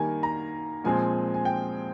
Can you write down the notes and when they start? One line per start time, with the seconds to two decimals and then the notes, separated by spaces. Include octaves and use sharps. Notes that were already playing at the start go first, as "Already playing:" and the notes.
Already playing: D#3 G3 A#3 G#5
0.23 A#5
0.84 A#2 F3 G#3 C4 G#5
1.34 G#5
1.45 G5